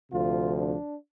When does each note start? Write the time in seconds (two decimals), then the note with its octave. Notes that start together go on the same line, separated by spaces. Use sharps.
0.11 D2 C3 F3 F4
0.56 D4